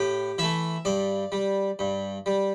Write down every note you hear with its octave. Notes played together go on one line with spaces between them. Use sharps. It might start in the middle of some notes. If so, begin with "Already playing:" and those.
Already playing: A2 G4
E3 A3 E5
G2 D5
G3
G2
G3